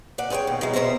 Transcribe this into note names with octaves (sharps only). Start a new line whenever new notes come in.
A#2 D5 F#5
G#4 A4 C5 C#5 G5
D#2 B2
B2 E3 F#3 G#3
E2 B2 C5 D#5 E5 A#5